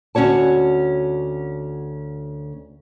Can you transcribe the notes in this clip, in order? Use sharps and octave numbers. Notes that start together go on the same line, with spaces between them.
D2 C#4 F#4 C#5 A5